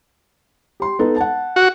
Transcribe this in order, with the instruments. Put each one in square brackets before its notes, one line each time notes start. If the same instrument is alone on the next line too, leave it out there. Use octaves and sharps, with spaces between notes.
[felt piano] G4 C6
B3 D#4 A4
F#5 A5
[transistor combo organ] F#4